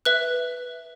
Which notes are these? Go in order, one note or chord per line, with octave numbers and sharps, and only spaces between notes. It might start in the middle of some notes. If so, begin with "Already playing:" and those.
B4 E5 F#6